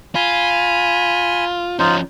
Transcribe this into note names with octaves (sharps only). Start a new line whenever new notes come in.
F4 G#5 B5
F3 C#4 D#4 F4 C5